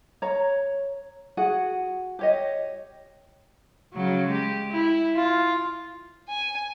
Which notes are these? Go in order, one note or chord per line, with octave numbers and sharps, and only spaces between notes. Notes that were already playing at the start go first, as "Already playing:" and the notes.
C#5 A#5
F#4 G#4 F#5
G4 C#5 D#5
C#3 F#3
G#3 G4
E4
F4
G#5